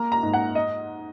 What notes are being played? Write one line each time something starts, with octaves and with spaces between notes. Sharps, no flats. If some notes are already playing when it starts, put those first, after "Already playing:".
Already playing: A#3 A#5
A#5
G#2
F#5
D#5